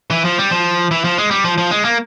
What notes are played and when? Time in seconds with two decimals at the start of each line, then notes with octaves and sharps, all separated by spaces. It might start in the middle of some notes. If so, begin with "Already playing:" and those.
0.10 E3
0.25 F3
0.38 G3
0.51 F3
0.91 E3
1.04 F3
1.18 G#3
1.31 G3
1.44 F3
1.58 F3
1.71 G#3
1.85 A#3